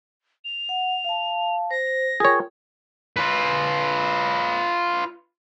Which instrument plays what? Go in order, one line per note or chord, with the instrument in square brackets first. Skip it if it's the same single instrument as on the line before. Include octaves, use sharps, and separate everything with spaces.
[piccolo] F7
[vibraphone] F#5
F5 A5
[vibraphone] C5 [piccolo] A#6
[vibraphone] F4 A#4 G5 [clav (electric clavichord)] G#4 C#5
[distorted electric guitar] F4 B4